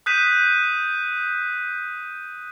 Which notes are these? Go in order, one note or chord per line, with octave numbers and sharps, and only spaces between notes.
D#6 F#6 G6 B6 D#7 E7